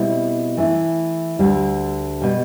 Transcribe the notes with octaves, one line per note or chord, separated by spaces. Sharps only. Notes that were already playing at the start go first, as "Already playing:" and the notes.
Already playing: B2 G3 C4 E4
E3 A3 E4
D2 D3 G3
B2 G3